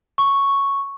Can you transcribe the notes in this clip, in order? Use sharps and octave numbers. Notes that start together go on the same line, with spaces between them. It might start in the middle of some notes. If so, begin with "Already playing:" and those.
C#6